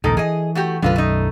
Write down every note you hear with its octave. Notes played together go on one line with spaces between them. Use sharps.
A#1 D#2 G#2 D#3 A4
E3 G#4 D#5
A3 F#4 G4
B1 F#2 D3 F4 B4
A3 D#4